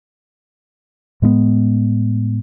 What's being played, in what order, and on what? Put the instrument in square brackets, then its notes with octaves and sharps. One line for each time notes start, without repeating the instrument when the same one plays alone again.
[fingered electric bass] A2 G#3 A3 B3